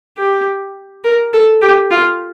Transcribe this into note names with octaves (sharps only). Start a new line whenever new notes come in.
G4
A#4
A4
G4
F4